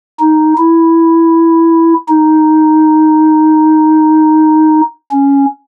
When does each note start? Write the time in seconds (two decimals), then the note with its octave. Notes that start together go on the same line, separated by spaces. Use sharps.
0.20 D#4
0.57 E4
2.09 D#4
5.11 C#4